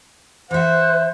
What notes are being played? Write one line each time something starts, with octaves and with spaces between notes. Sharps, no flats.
E3 C5 E5 F#5